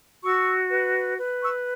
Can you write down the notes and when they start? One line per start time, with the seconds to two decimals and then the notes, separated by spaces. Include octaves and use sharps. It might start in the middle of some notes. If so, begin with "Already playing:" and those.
0.23 F#4 C#6 E6
0.70 B4
1.18 B4
1.41 C#6 E6